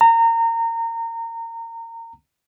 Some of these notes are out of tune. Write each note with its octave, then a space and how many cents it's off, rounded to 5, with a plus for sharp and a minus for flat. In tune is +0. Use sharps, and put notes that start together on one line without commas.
A#5 -25